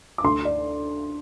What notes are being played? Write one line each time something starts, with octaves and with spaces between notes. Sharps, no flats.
D6
D2 C6
D5